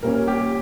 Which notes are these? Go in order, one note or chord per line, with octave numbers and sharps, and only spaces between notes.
A#2 G3 A#3 C#4 A#4
G4